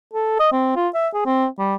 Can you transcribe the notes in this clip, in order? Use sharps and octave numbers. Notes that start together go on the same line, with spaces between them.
A4
D#5
C4
F4
E5
G#4
C4
G3